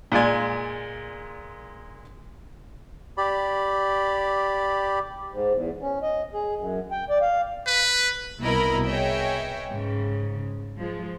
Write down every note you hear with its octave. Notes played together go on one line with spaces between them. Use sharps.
A#2 G#3 F4 D5 G#5
G4 D5 B5
G#2
E2
C#4
D#5
G#4
F#2
G5
D5
F5
B4
C2 B2 E4 A#4 D#5 B5
G#4 B4 C#5 D#5 E5 G5
G#2 C#3
F3 G#3